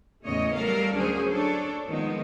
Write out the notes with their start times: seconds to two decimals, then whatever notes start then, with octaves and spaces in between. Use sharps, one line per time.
0.24 E2 A2 C#3 A3 C#5 D#5
0.55 F#3 G3 A4 A#4 F5
0.93 D2 F#3 C#4 D4 G#4 C5
1.30 D4 A4 C#5
1.86 D#3 F3 G#3 B3 D#4